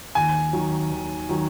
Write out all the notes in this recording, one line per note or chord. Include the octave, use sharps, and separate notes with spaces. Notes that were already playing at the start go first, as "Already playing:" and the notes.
D#2 G#5
D#3 F#3
D#2
D#3 F#3